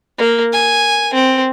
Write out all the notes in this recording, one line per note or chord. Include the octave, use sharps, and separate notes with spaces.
A#3
G#5
C4